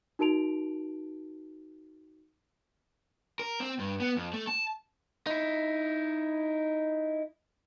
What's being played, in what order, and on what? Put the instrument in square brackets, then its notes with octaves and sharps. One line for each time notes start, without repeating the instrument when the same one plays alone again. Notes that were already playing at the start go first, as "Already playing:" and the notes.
[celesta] D#4 F#4 A#4 A5 D7 F7
[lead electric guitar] A#4
C4
G2
B3
F2
A3
A5
D#4 E4